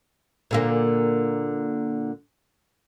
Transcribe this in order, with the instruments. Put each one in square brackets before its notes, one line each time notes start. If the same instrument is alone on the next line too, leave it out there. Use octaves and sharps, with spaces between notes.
[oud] A#2 D3 A#3